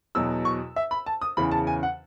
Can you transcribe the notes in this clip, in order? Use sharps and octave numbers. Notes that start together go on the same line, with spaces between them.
E2 B2 F#3 E6
C#6
E5
B5
A5
D#6
E2 C#3 E3 B5
A5
G#5
F#5